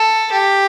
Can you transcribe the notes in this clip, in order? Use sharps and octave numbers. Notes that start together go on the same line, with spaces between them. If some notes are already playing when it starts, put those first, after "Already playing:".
Already playing: A4
G4